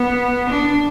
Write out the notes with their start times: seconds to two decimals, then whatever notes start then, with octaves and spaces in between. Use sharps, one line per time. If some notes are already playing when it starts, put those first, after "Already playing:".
Already playing: B3
0.50 D4